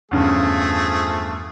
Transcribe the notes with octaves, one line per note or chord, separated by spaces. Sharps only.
E2 G2 C#3 F3 A3 G#4